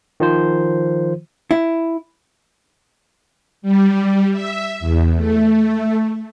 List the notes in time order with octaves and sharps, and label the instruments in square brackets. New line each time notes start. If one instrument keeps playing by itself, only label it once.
[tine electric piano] D#3 F3 F4 C5
[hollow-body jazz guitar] E4
[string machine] G3
E5
E2
A3